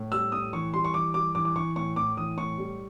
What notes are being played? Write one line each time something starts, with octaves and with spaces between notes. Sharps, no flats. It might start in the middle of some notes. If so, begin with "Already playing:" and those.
Already playing: A2
G3 E6
A2 D#6
E3 C#6
G3 C6
C#6
E3 D6
G3 D6
E3 D6
D6
E3 C#6
A2 C#6
A2 D6
E3 D#6
A2 C#6
G3